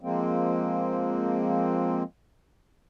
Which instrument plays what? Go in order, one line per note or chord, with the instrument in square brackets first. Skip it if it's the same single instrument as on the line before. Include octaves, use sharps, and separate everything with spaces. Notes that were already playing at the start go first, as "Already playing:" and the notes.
[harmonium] F3 G#3 A#3 C4